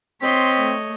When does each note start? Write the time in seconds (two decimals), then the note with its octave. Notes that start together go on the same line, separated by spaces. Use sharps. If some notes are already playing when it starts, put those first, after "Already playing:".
0.22 C4 C#5 D#5 C6 B6
0.60 A3